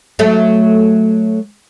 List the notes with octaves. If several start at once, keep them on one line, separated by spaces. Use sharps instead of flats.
F#3 A3